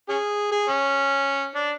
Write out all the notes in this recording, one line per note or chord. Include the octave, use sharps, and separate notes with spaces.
C#4 G#4
G#4
C#4
D4